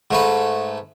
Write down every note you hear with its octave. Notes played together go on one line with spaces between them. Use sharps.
G#2 A3 B4